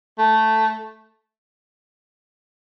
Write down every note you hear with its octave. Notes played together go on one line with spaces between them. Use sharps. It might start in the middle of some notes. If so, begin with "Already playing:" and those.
A3